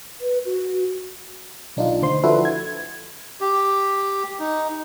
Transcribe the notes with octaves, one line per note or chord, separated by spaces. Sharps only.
B4
F#4
B1 D4 D#4 F4
D2 C5 C6
F3 D4 E4 F#4 A4 B4
G#6
G4
D#4